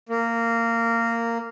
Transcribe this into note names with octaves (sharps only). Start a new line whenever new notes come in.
A#3